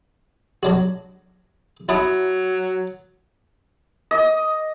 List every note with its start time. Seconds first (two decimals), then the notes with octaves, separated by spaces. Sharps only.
0.63 F#3 D4 F#4
1.89 F#3 E4 A5 D#6
4.11 D#5